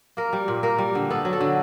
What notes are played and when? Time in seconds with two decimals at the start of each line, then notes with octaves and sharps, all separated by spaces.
0.17 A#3 A#4
0.33 G3
0.48 A#2
0.63 A#3 A#4
0.78 G3
0.95 D3
1.10 B3 A4
1.25 F#3
1.33 A4
1.41 D3